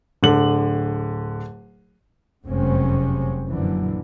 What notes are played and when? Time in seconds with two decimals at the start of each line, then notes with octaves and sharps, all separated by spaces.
0.23 D1 D3 F#7
2.46 F1 F#2 C3 G#3 C4 C#4
3.50 A#1 F#2 D3 E3